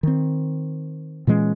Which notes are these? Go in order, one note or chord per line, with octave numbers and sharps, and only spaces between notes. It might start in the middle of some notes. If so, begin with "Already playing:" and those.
D#3 C4
A#2 E3 G#3 C#4